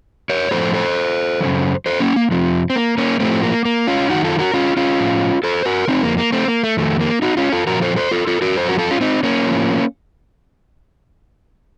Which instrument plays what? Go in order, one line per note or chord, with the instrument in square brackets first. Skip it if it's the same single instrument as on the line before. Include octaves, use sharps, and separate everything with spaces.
[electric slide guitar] A#4 C#5
A2 F3 A4 C5
A4 C5
F3
F#2 C#3
A4 C5
A#3 C#4
A#3
F2 C3 F3
C4
A#3
A#3 C#4
A2 F3 A3 C4
A#3
A#3
C#4 F4
F#2 D#3 D#4 F#4
F4 A4
F#4 A#4
C#4 F4
C#4 F4
A2 F3
A4 C5
F#4 A#4
F2 D#3 C4 D#4
A#3
A#3
A3 C4
A#3
A3
F2 D#3 A3
A#3
D#4 F#4
C#4 F4
F4 A4
A#2 F3 F#4 A#4
A4 C5
A4 C5
F4 A4
F4 A4
F#4 A#4
F#2 F3 A4 C5
F#4 A#4
F4 A4
C#4 F4
C4 D#4
A#3 C#4
A2 F3